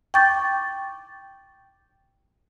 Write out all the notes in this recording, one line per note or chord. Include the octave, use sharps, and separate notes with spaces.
G5 C#6 D6 G6 A6